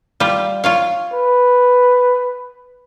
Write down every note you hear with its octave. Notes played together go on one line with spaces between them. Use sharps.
G3 F4
F4 C#5 F5
B4